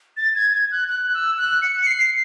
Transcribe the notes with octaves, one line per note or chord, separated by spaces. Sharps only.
A6
G#6
G#6
F#6
F#6
E6
F#6
C#7
C#7
C7